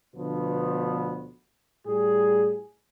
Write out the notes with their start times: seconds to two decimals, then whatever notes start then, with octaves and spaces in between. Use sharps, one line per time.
0.15 D2 B2 D3 F3 B3
1.86 A2 G3 G#4